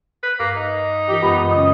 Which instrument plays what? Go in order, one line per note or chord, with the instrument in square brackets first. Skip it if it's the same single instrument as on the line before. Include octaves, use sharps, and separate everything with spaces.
[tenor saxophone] B4
[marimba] G2 [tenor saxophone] A#3
[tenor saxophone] D#4
[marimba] E3 F4 A#4 [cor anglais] G4
[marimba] F#2 G#3 A#5 [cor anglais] B3
[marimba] C#3 F#3 C#4 [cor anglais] D#5